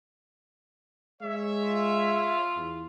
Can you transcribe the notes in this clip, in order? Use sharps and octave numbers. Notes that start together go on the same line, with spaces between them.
G#3 C#5 E5
F4
E2